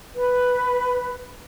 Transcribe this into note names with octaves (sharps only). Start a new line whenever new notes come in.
B4